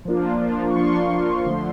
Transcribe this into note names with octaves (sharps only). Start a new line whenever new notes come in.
F3 A#3 D4 F4
F3 A#3 D4 F4
C#6
F3 A#3 D4 F4 C6
F3 A#3 D4 F4
D3 F3 A3